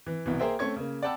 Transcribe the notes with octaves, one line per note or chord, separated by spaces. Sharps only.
E3
C2 B2 E3
A#3 G#4 A#4 C5 E5 G5
A3 C4 C#4 C#6 G#6
C#3 A#3
D5 F#5 G5 A5 B5 E6